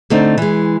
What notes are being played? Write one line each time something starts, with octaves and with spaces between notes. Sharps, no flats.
D3 A3 C4 D#4
E3 G#3